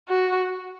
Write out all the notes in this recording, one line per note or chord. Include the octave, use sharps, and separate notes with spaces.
F#4